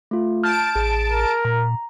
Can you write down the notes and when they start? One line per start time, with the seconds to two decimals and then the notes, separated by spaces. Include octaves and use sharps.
0.11 A3 F4
0.44 A5 F6 G6 D7
0.75 A1 G#4
1.10 A#4
1.45 A#2 A#5